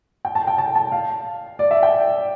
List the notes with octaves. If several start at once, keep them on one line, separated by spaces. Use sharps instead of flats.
G5
A5
G5
A5
A5
F5
D5
E5
G5